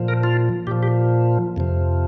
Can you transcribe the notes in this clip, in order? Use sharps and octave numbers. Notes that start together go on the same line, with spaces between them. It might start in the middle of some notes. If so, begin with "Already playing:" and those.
Already playing: A#2 F3
A#4
F4
A#2 F3 G4
G4
F2 C3 F3